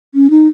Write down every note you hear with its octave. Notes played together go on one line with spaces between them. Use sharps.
C#4
D#4